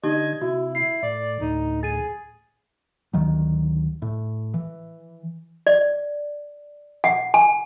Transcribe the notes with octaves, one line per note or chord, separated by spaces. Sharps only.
D3 D#4 G4 D#5 G#6
C3 E4 F#4
E4 C7
A2 D5
D2 A2 D#4
G#4 A6 D#7
D2 D#3 F#3
A2
E3
D5
F#5
G#5